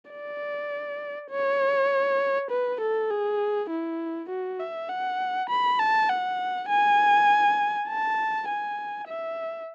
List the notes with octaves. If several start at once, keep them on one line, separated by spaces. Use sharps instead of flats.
D5
C#5
B4
A4
G#4
E4
F#4
E5
F#5
B5
A5
F#5
G#5
A5
G#5
E5